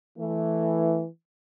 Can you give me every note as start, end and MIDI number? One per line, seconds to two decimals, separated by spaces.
0.19 1.06 52
0.19 1.02 57